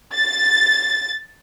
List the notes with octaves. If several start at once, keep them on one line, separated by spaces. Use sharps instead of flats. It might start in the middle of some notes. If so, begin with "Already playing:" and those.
A6